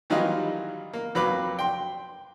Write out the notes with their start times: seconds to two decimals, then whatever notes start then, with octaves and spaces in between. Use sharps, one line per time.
0.10 D#3 E3 F#3 G3 D#4 F4
0.93 A#3
1.15 F2 F#3 B4 F5 B5 D6
1.59 G5 C6